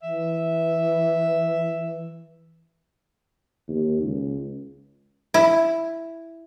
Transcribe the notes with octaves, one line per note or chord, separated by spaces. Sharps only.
E3 E5
D#2
C#2
E4